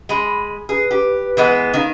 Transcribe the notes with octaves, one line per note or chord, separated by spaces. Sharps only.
G#3 B5
G#4 B4
G4
E3 G#3 B3
D#3 F5